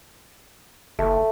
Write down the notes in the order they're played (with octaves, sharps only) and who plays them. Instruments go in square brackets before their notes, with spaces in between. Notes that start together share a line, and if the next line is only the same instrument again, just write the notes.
[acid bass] F#1 [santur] A3